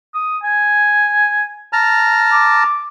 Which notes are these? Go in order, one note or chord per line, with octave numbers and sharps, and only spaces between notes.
D#6
G#5
A5 A#5 F6
D6